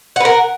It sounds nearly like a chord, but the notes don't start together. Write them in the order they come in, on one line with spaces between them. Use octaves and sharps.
F#5 B4 A#4